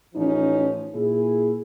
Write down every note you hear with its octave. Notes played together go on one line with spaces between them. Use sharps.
A1 F3 C#4 D#4
A#2 E4 G#4